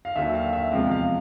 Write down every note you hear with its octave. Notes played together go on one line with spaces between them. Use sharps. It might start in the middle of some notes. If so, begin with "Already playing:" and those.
F5
D#2 D3 F#3 E5
F5
E5
E2 C3 F3 G#3 F5
F5